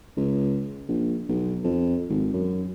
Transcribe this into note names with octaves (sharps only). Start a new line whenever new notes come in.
C#2
A#1
B1
F2
G#1
F#2